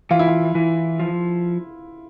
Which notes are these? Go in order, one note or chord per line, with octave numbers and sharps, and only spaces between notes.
E3 F4
E4
F4
E3
F3